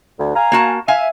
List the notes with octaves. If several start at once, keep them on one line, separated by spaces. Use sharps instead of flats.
D2
F5 G#5 A#5
A#3 F#4 A5
E5 F5 G#5